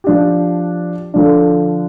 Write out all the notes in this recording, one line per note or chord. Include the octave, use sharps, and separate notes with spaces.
F3 D4 G4
D3 F3 D4